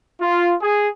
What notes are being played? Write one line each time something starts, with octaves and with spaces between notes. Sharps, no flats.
F4
G#4